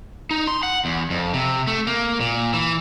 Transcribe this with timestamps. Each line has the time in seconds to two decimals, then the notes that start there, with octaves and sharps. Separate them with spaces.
0.31 D#4
0.47 C6
0.63 F#5
0.85 E2
1.10 F2
1.33 C3
1.67 A3
1.87 A#3
2.21 A#2
2.54 E3